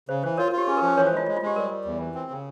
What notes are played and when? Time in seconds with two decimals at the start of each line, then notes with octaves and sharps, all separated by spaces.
0.09 C#3 C5
0.23 E3 C5
0.38 F4 A#4 C#5
0.48 A#4
0.52 F4
0.58 G4
0.67 C#4 G#4
0.77 A#4
0.82 F3
0.87 C5
0.97 E3 A#4 C#5
1.07 C5
1.12 G#3 F4
1.26 G#3 F4
1.37 F4
1.42 G#3 G4
1.56 G3 A#4
1.70 G3
1.85 E2
2.00 E3
2.14 C4
2.30 C#3